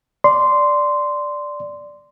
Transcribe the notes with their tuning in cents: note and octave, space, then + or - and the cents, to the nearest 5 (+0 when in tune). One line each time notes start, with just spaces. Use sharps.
D5 +0 C6 -10